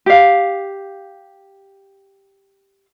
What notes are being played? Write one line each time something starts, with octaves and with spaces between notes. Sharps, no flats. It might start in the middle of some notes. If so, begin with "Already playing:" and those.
G4 F5